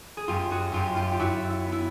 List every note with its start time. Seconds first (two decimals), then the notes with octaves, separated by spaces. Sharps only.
0.17 G#4
0.28 F#2 F4 G4
0.51 F#4 G#4
0.72 F#2 F4 G4
0.96 F4 G4
1.12 G4
1.19 F#2 E4 F#4
1.50 E4
1.66 B3
1.72 E4